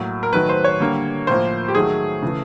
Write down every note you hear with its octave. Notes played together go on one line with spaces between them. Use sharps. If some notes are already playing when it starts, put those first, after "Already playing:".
Already playing: A2 F#3 A#3
A#4
D#3 F#3 A3 B4
C5
C#5
D3 G3 A#3
A2 F3 A#3 C5
G4
D#3 F#3 A3 G#4
C#3 E3 A3